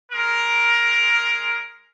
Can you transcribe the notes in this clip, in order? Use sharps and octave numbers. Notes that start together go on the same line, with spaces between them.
G#3 A#4